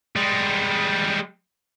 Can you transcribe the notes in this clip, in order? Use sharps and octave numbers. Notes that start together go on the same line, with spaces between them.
G3 G#3